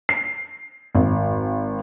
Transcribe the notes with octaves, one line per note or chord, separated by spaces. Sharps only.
C7
G#1